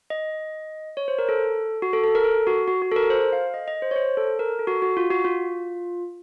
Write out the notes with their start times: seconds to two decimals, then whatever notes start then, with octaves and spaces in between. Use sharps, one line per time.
0.10 D#5
0.97 C#5
1.08 C5
1.19 A#4
1.29 A4
1.82 F#4
1.93 A4
2.04 A4
2.15 A#4
2.24 A4
2.47 F#4
2.67 F#4
2.82 F#4
2.92 A4
2.96 A#4
3.10 C5
3.33 F5
3.54 D#5
3.68 D#5
3.82 C5
3.91 C#5
3.96 C5
4.17 A4
4.39 A#4
4.59 A4
4.67 F#4
4.82 F#4
4.97 F4
5.11 F#4
5.24 F4